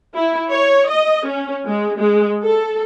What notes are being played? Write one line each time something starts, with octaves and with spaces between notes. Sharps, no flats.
E4
C#5
D#5
C#4
G#3
G#3
A4